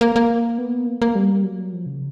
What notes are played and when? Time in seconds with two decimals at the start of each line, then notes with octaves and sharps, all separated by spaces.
0.01 A#3
0.16 A#3
0.58 B3
0.87 A#3
1.02 A#3
1.15 G3
1.44 F#3
1.73 F3
1.86 C#3